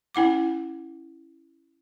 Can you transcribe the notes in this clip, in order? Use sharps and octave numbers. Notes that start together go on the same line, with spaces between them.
C#4 E4 F#5 D6